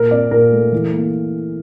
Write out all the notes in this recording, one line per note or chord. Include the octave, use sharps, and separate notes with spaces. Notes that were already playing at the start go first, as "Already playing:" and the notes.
Already playing: A#2 A#4
C4 D5
A#2 A#4
A3
E3
A#3